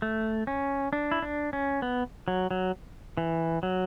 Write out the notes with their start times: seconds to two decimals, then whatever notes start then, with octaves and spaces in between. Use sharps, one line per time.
0.02 A3
0.47 C#4
0.93 D4
1.12 E4
1.22 D4
1.53 C#4
1.82 B3
2.28 F#3
2.51 F#3
3.17 E3
3.63 F#3